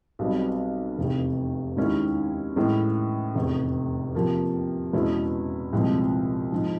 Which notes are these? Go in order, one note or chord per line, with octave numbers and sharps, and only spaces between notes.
B1 B2 G3 C4
F1 E2 C3
D#2 D#3 G#3 C#4 E4
A2 E3 G#3 C#4
F1 E2 C3
C3 F3 A#3
E2 B2 G#3 C#4 E4
C2 A#2 F3 G#3 C4
G#2 F3